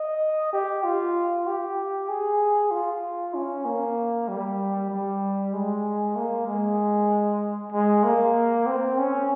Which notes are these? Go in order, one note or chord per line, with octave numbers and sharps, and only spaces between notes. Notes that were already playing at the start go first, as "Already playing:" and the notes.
Already playing: D#5
G4
F4
G4
G#4
F4
C#4
A#3
G3
G3
G#3
A#3
G#3
G#3
A#3
C4
C#4